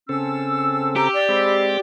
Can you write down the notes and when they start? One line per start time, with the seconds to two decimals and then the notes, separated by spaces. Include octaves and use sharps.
0.09 C#3 C4 C#4 A4 E6
0.96 G4 A#5
1.14 D5
1.29 G#3 C4 C5 B5 E6